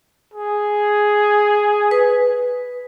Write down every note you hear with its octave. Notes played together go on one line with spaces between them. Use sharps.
G#4
B4